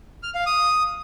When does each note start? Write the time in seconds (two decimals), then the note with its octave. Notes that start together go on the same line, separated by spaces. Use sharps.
0.23 F6
0.35 F5
0.46 D#6